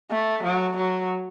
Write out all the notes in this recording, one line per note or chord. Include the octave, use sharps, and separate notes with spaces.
A3
F#3
F#3